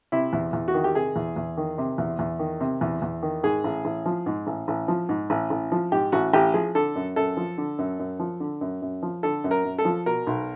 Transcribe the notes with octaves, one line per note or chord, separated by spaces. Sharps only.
C3 E4
E2
E2
F#4
D#3
G4
C3 G#4
E2
E2
D#3
C3
E2
E2
D#3
C3
E2
E2
D#3
G#2 G#4
A1
A1
F3
G#2
A1
A1
F3
G#2
A1
A1
F3
G#2 G4
A1 F#4
A1 G4
F3 G#4
D3 A4
F#2
F#2 A4
F3
D3
F#2
F#2
F3
D3
F#2
F#2
F3
D3 A4
F#2
A#4
F#2
A4
F3
B2 A#4
B1